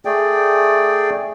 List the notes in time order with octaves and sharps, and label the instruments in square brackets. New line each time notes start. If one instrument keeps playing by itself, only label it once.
[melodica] A3 G#4 D5 G5